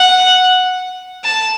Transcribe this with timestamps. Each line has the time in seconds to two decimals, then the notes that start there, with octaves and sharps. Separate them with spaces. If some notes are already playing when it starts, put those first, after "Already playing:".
Already playing: F#5
1.25 A5